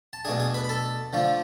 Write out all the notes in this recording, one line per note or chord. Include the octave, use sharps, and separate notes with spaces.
A5
B2 A3 D4 G#4 G#5
G#4 G#5
B4 B5
B5
A4 A5
D3 F3 A3 D4